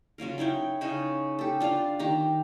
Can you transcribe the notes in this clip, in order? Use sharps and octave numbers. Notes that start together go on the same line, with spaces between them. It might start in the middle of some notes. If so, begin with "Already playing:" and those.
C#3 F#3 F4 A#4
D#4 E4 C#5 G5
C#3 C#4 D#4 G#4
G4 A4
D4 F4 F5 A#5
D#3 G4 A#5